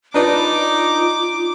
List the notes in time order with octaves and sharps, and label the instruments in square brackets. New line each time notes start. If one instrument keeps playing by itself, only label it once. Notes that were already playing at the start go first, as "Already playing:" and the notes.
[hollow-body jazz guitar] D4 B4 D5 [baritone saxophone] D#4 [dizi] F4 [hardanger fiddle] D6